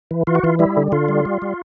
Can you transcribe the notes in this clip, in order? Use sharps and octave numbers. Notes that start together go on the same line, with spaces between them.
E3
E3 F4
F#4
E3 F4
G3 E4
D3
D3 F4
G3
G3
G3